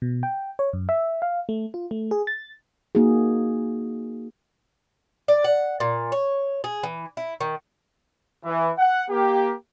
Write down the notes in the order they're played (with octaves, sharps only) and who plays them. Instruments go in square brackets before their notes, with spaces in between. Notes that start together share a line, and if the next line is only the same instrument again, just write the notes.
[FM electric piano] B2
G5
C#5
F#2
E5
F5
A3
F4
A3
G#4
A6
[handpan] A#3 D#4 F#4 G#4
[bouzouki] D5
F#5
A#2
C#5
G#4
E3
E4
D#3
[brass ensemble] E3
F#5
A#3 G4